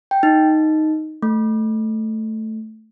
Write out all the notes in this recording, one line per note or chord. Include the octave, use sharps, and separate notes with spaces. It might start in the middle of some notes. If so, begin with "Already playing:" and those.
G5
D#4
A3